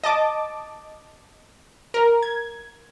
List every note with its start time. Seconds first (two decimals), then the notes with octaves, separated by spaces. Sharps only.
0.04 D#5 A5 D6
1.94 A#4
2.23 G#6